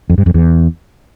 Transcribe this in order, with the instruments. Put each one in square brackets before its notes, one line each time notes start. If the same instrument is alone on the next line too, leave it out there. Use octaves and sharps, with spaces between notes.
[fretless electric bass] F2
G2
F2
E2